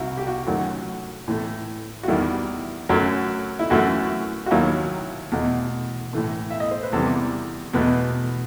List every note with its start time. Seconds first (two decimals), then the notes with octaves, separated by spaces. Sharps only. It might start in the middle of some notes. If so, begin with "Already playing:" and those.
Already playing: C2 E3 E4 F#4
0.17 G4
0.27 F#4
0.47 F#2 D#3 F#3 A3 F#4
1.28 A2 E3 A3
2.03 F#4
2.08 E2 D#3 G3 E4
2.89 F#2 F#3 A3
3.59 E4
3.70 F#2 E3 A3 F#4
4.46 F#4
4.51 D#2 D#3 F#3 E4
5.32 E2 B2 A3
6.13 A2 E3 A3
6.50 E5
6.60 D#5
6.71 C5
6.83 B4
6.93 E2 C3 E3 G3 A4
7.74 E2 B2 A3 B4